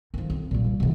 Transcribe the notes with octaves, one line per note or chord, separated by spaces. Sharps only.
D#3 F3
F2
A#2 G3
G3
B2 E3